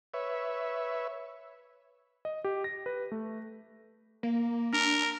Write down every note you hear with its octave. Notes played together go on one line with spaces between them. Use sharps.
B4 C#5 E5
D#5
G4
A#6
B4
A3
A#3
D4 A#4